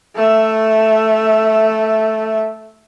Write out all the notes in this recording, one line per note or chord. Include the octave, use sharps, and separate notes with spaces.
A3 E5